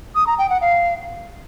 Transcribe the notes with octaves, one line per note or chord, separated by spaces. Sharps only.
D#6
A#5
G5
F#5
F5